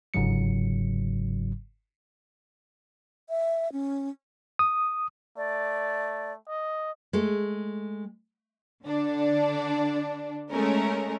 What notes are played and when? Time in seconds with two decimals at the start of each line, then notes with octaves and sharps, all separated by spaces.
0.14 G1 G#2 C#3 F#3 C#7
3.30 E5
3.73 C#4
4.59 D#6
5.37 A3 D5
6.48 D#5
7.13 G#3 A3
8.85 D3 D4
10.50 G#3 A3 C#4 A#4